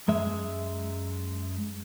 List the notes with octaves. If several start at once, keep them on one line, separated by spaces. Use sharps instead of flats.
F#2 G#3 E5